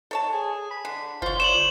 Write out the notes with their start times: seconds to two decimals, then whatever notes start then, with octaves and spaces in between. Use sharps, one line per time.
0.11 A4 C#5 A5
0.32 G#4
0.71 B5
0.85 D3
1.22 F#1 F4 C5 C#5
1.40 C#5 D5 E7 F#7